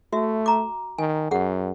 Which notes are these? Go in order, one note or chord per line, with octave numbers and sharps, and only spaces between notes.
A3 F#4 E5
A#5 D6
D#3 G#5
F#2 G#4 F#5